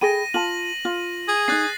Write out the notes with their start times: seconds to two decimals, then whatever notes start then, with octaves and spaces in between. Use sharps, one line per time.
0.01 G#4 G5 B5 A#6 D#7
0.34 F4 A5 F#7
0.85 F4
1.28 G#4
1.48 D4 D#4 F#6 A6 C7